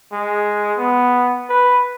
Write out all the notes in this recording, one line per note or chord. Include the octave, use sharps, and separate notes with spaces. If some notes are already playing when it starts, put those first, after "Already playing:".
G#3
B3
B4